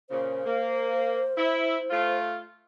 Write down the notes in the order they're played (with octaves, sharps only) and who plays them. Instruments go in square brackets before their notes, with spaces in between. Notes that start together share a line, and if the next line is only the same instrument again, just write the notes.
[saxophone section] A#2 C#3 [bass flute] C5
[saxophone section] A#3
E4
A3 F4